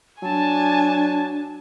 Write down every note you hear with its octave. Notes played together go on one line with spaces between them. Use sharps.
F#3 D4 G#5 A5